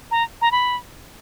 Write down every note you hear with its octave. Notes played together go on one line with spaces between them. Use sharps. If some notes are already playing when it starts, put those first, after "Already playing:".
A#5
A#5
B5